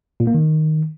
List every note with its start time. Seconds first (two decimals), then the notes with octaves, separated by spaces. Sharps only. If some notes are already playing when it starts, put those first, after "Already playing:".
0.20 A#2
0.27 A#3
0.34 D#3